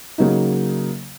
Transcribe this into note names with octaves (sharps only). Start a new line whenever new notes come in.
C#3 F#3 A#3 D#4